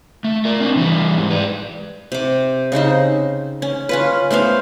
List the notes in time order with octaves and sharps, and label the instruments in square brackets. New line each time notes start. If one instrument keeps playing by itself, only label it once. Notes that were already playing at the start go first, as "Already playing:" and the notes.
[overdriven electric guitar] A3
A#4 D5
C4 D4
E3 G3
G#2
B4 D5
[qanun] C3 D6
C#3 C4 D#4 C5
C#4
C#4 F4 B4
A3 B3 C5 F5